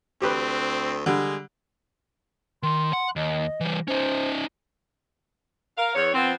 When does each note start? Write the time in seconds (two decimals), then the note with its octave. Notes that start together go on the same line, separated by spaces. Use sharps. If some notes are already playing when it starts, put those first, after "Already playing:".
0.22 D2 C4 G4 B4
1.06 D3 G3 G#3
2.63 D#3 C6
2.93 F#5
3.16 D#2 D#5
3.60 E3 G3
3.88 C#4 D#4 C5
5.77 A#4 F5
5.95 E2 C#5
6.14 F3 B3 C4